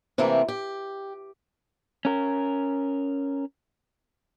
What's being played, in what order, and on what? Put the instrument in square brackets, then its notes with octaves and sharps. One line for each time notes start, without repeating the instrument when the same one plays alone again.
[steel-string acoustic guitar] C3 E3 A3 A#3 C4
G4
[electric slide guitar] C#4 A#4